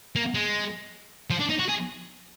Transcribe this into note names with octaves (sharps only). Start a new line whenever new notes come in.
A#3
G#3
F3
D4
D#4
F#4
G#4